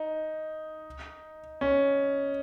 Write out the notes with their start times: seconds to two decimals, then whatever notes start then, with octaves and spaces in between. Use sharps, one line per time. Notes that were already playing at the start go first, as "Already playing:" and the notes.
Already playing: D#4
1.61 C#4